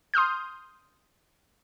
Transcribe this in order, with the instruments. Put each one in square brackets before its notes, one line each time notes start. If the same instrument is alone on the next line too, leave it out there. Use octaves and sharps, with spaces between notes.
[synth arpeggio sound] C6 D#6 F6 G6